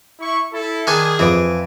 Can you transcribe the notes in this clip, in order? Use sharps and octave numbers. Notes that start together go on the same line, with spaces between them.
E4 C#6
E4 A4
D#3 D4 G#4 G#5
F2 E3 D7